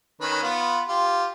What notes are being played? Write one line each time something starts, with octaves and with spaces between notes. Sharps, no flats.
D#3 C#4 B4
B3 F4
F4 G4